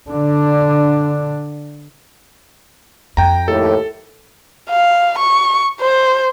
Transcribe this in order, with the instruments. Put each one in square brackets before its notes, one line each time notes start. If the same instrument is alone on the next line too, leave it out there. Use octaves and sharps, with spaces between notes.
[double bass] D3 D4
[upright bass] F2 [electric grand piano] G5 A#5
[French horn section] D#2 A2 G4 [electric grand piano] A4
[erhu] F5
C#6
C5